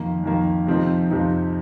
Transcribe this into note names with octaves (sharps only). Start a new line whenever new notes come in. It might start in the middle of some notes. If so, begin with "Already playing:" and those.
Already playing: F2 D#3 A#3
F2 D#3 A#3
F2 C3 F3 C4 D#4
F2 C3 F3 C4 D#4